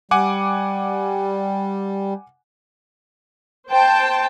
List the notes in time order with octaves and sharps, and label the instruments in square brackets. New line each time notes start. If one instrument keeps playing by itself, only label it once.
[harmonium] G3 [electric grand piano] F#5 G#5 D6
[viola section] C5 G5 A5